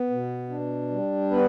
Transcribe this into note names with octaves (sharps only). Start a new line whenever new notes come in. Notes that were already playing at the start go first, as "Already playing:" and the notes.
Already playing: B3
B2
D4
G3
B3 B4